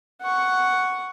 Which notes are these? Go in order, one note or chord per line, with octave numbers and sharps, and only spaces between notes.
F#5 C#6